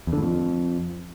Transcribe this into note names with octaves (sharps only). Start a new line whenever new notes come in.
E2
D3
A2
F2